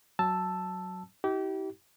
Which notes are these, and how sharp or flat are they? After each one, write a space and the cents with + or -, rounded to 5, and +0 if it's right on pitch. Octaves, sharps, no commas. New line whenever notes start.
F#3 +0 A5 +0 E6 +5
E4 -45 G4 -30